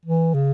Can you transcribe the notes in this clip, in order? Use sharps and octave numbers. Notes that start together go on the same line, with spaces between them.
E3
C#3